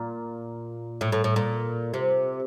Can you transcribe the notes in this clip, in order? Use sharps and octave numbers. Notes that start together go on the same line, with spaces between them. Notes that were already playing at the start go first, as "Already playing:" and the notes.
Already playing: A#2
A2
A2
A2
A#2
C3